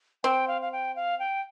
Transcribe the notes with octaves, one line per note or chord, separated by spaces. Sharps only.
C4 G5
F5
F5
G5
F5
G5